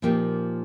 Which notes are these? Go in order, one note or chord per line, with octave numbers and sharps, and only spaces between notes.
A#2 F3 A#3 D#4 G4